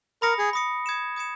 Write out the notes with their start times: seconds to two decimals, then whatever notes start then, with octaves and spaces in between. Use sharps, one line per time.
0.22 A#4 B5 D#6 A#6 C#7
0.39 G#4
0.53 B5 D#6 A#6 C#7
0.86 D#6 G#6 C#7 E7
1.16 D#6 G#6 C#7 E7